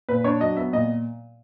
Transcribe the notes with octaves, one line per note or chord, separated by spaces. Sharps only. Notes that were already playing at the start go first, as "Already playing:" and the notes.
A#2 B4
D4 C#5
F#3 D#5
B3 E5
A#2 D#5